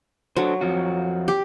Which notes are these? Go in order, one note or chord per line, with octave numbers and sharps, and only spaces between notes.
F#3 D4 A4 C5
F2 F3 F#4
G4